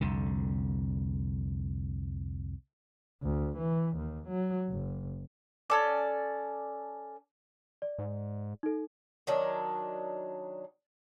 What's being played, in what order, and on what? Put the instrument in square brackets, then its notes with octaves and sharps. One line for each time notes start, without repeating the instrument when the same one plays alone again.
[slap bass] C2 F2 D3
[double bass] D2
E3
D#2
F#3
F#1
[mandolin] C#4 A4 D5
[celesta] D5
[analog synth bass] G#2
[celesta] D#4 A4
[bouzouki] D#3 F#3 D4